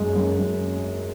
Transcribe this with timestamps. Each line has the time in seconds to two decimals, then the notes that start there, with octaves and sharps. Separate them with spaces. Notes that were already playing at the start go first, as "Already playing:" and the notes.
Already playing: F#2 G#3
0.15 F#2
0.39 F#2